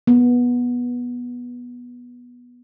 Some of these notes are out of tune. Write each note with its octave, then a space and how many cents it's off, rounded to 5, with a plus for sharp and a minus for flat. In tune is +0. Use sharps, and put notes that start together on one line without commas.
B3 -15